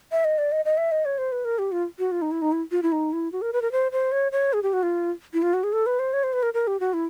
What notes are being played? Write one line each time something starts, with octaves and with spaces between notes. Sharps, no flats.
E5
D#5
D5
D#5
D#5
E5
D#5
C#5
C5
B4
A#4
G4
F4
F#4
F4
D#4
E4
D#4
E4
F4
E4
D#4
E4
F#4
A#4
B4
A#4
C5
C5
C#5
C#5
G#4
G4
F#4
F4
E4
F4
F#4
G#4
A4
B4
C5
C#5
C5
B4
A#4
A#4
G4
F#4
E4